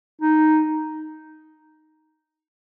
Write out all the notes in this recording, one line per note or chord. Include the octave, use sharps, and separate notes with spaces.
D#4